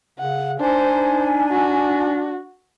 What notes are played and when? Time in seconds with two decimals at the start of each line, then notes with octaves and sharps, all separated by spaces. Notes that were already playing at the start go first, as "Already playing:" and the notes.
0.19 C#3 F#5
0.60 D4 D#4 C5 G#5
1.51 F#4